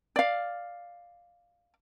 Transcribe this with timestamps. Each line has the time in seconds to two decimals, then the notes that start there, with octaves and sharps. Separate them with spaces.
0.16 D5 F5